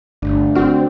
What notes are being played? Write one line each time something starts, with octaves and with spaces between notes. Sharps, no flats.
G1 D3 A3 D4
C4 F#4 F6